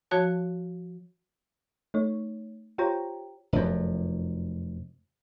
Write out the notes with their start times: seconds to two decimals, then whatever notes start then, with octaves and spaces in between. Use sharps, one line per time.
0.11 F3 F#4 C#5 A5
1.94 A3 D#4 C#5
2.78 F4 G4 C5 C#5 G5 A#5
3.53 F1 F#2